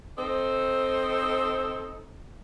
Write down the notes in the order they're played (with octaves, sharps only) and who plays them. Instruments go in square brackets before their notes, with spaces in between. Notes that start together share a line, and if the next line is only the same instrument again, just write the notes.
[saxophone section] C4 D#4 A4 C5